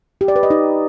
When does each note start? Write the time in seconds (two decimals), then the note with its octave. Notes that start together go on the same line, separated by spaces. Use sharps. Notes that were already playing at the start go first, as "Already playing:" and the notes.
0.21 G4
0.28 D5
0.36 B4
0.43 D#5
0.50 D#4